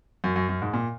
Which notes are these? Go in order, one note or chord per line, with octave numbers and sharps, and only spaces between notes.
F#2
F#2
F#2
G#2
A#2